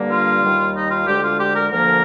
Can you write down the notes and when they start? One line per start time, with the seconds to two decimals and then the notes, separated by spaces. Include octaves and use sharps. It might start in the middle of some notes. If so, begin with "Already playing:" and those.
Already playing: G2 D3 G3 A#3
0.10 F4
0.42 D#2 D#3 G3
0.75 D#4
0.90 F4
1.06 D2 D3 G#3 G4
1.22 F4
1.38 G4
1.54 A#4
1.70 D2 D3 F3 A#3 A#4